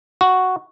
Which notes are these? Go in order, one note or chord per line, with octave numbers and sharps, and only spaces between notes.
F#4